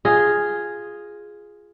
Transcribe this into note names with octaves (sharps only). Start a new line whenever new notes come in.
F4 G#4 D#5